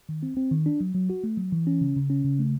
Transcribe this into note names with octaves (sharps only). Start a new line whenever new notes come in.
D#3
C4
C4
D#3
D4
F#3
F#3
F#4
A3
F#3
E3
C#4
C#3
C#3
C#4
C#3
A3